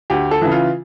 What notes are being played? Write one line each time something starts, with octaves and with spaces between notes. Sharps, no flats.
D2 G4
A4
C#3 E3
F4